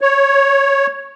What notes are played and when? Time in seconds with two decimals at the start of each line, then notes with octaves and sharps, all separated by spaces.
0.01 C#5